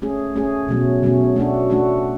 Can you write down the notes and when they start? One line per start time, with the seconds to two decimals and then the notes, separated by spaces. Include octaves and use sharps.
0.02 A3 C#4 G#4
0.36 A3 C#4 G#4
0.68 B2 F#3 A3 C#4
1.03 B2 F#3 A3 C#4
1.36 A3 D4 F#4 A4
1.70 A3 D4 F#4 A4